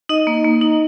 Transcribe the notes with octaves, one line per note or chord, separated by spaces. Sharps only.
D#4 D#5
A#3
A#3
D#4